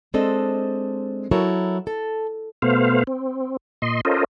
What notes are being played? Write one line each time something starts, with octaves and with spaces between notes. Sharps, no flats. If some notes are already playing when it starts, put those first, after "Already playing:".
G#3 C4 D4 A4 C5 D#5
F#3 E4 F#4 A4 A#4 C#5
A4
B2 A3 B3 C5 F5
C4
A#2 D#5 C6
C#4 F4 A4 A#4 C5 D#5